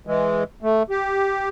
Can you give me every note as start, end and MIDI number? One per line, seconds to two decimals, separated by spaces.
0.07 0.44 52
0.07 0.44 56
0.62 0.83 57
0.90 1.49 67